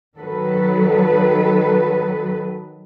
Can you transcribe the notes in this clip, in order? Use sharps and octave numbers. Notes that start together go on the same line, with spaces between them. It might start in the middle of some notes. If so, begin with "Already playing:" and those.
D#3 F#3 A4 B4